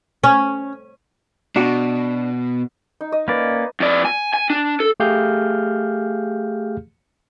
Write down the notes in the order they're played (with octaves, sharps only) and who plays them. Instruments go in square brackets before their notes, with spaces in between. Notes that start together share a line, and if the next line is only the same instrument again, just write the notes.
[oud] C#4
[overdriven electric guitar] B2 [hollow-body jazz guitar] D4 F#4
[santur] D#4
D#5
[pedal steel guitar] A#3 C#4 D5 [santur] B4
[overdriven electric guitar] F2 D5
G#5
G#5
D4
A4
[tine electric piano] A3 G4 G#4 F5 F6 G6